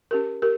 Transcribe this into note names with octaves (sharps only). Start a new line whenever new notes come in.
C#4 G4 A#4
G4 A#4